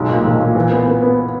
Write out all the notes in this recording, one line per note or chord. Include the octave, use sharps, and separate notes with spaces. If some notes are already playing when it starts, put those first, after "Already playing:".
Already playing: B1 G#3
A#2
B1
A#2
E3
B3
B3
B3